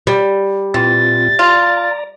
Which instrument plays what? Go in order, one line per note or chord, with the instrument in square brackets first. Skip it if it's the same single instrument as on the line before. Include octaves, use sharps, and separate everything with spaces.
[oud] G3
[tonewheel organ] A#2 C4 F4 [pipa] E3 [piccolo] A6
[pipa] F4 [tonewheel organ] D5 A#5